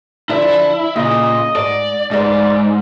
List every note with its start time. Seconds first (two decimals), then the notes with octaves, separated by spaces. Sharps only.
0.29 D3 F3 D4 E4
0.96 A#2 C#3 D#5
1.56 G#2 D5
2.11 G#2 D#4 G4 B4 D5